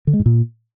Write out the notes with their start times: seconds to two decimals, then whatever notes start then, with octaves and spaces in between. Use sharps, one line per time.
0.07 D3
0.13 G#3
0.20 G#2
0.26 A#2